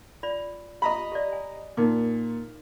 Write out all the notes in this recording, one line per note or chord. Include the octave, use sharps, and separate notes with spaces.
F4 D5 B5
G4 D#5 A#5 B5
G4 D5
G#5
A#2 D#4 A#4 D6